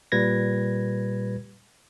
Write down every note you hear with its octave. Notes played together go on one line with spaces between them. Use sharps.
A#2 G3 B4 G#6 A#6